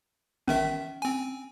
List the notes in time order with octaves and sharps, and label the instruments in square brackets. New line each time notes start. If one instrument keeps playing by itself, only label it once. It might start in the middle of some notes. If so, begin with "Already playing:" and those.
[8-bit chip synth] A1 D#3 E5 [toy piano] C#4
[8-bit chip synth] C4 G#5